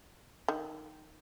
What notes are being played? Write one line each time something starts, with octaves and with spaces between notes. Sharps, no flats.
D#3